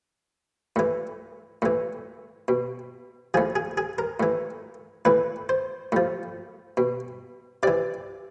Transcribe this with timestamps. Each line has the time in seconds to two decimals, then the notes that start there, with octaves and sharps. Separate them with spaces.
0.76 A2 E3
1.62 A2 E3
2.48 B2
3.34 A2 F3 G#4
3.56 G#4
3.77 G#4
3.98 A#4
4.20 A2 E3
5.05 A2 E3 B4
5.49 C5
5.92 A2 F3
6.77 B2
7.63 C3 E3 D5